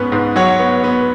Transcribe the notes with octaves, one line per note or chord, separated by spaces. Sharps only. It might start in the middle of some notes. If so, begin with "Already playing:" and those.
Already playing: G#2 B3 C#4 B4
G#2
F#3 C#5 F#5
B3
B3